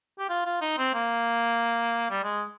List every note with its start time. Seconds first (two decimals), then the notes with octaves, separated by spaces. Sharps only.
0.19 G4
0.29 F4
0.46 F4
0.61 D#4
0.78 C4
0.94 A#3
2.11 G3
2.24 G#3